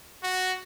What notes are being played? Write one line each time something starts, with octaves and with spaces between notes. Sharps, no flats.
F#4